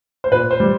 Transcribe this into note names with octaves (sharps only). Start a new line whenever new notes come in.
C5
A#2 B4
C5
G3